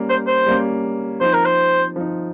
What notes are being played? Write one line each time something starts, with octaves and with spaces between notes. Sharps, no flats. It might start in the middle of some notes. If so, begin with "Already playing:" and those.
Already playing: G3 A#3 C#4
C5
C5
G3 A#3 C#4
F3 C4 D#4 C5
A#4
C5
F3 C4 D#4